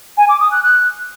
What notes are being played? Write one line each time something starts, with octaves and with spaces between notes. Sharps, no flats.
G#5
D6
D#6
F#6
F#6